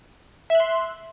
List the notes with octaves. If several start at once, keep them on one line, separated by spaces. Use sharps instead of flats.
E5 C6 F#6